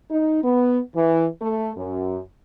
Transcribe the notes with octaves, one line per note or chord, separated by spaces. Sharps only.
D#4
B3
E3
A3
F#2